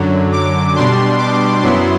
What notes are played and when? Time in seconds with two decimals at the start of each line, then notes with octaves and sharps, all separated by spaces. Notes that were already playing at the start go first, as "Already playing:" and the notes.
Already playing: F#2 D3 F#3
0.32 D6
0.76 B2 G3 D4 C6
1.18 D6
1.62 F#2 F#3 B3 E4 C6